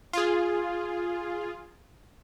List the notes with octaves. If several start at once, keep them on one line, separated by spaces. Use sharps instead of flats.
F4 G#4